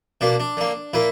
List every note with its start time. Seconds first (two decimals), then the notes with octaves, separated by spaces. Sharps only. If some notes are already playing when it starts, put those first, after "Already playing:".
0.21 B2 A#3 D4
0.40 D4
0.57 D3 A#3
0.94 A#2 A#3 E4